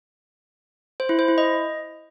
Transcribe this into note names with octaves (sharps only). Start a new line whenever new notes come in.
C5
E4
C5
E4
D#5